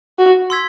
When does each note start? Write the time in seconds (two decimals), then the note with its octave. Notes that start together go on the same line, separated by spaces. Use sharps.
0.19 F#4
0.50 C6 E6 G#6 B6